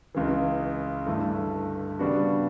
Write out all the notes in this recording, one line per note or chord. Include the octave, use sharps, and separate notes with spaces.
C#2 C#3 E3
G2 D3 A3 E4
C#3 G3 B3 D4 F#4